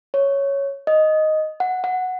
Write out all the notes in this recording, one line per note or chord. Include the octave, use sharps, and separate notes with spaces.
C#5
D#5
F#5
F#5